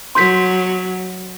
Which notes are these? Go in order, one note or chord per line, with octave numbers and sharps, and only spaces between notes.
F#3 C6 G6 B6